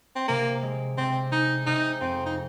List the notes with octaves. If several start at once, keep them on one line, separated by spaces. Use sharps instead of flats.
C4
C3 A#3
G#3
C3 C4
G#3 D#4
C3 D#4
F2 C4
D#4